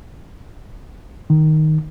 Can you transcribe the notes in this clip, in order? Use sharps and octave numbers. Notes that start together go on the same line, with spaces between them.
D#3